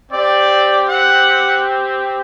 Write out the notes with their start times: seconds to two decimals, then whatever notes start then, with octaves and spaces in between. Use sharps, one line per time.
0.12 C4 G4 D5
0.88 F#5